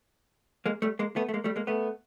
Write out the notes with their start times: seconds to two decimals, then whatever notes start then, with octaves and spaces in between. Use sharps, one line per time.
0.66 G#3 A#3
0.82 G3 A3
0.99 G#3 A#3
1.16 A3 B3
1.29 A3
1.34 G#3 A#3
1.44 G3 A3
1.56 G#3 A#3
1.67 A3 B3